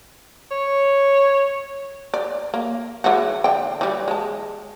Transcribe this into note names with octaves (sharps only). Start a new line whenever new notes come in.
C#5
D5
A#3
E3 G#3 F#4
D3 G5
E3 G3
G#3 A5